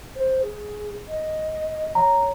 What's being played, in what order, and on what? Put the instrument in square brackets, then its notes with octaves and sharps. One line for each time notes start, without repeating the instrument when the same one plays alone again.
[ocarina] C5
G#4
D#5
[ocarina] C#5 [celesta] A#5